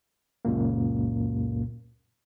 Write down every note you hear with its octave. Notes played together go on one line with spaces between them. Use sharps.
C#2 F#2 A#2 A#3